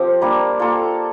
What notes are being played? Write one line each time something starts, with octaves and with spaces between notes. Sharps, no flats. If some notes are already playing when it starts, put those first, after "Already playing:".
Already playing: F3 C4 G4 A4
G3 A#3 D4
A#3 F4 A4